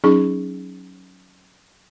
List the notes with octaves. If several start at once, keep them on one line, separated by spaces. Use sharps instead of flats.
F#3 C#4 D#4 G#4 C#6